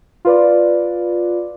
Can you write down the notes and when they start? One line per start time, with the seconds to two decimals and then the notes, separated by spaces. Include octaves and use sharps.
0.25 F4 B4 D5